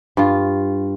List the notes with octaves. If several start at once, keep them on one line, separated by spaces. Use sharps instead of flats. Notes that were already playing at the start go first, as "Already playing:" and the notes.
G2 F4